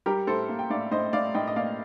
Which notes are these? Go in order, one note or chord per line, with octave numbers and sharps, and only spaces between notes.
G3 G4 A#4
A2 A4 C5
A#3
G5
A2 D5 F5
A2 C5 D#5
A2 D5 F5
A2 D#5 G5
D#5
A#3 D5 F5